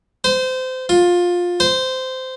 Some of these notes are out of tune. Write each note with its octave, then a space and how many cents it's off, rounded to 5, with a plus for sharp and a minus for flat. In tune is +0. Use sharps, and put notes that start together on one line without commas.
C5 -25
F4 +15
C5 -15